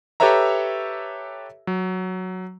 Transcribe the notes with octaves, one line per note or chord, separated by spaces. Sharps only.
G4 A4 B4 C#5 E5 A#5
F#3